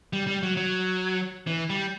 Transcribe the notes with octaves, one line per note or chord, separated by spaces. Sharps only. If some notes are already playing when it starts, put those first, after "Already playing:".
G3
G3
F#3
F#3
E3
G3